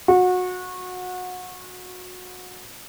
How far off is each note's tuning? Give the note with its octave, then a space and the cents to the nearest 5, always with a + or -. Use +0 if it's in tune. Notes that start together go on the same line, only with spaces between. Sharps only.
F#4 -25